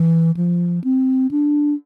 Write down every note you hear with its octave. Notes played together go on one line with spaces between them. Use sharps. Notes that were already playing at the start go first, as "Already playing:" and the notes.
Already playing: E3
F3
C4
D4